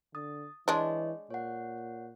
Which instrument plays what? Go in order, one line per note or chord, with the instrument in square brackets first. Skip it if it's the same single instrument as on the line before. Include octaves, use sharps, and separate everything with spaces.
[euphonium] D3 [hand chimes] D#6 A6
[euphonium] E3 [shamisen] G#3 D4 [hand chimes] C#5 D#5
[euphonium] A#2 [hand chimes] C#5 F#5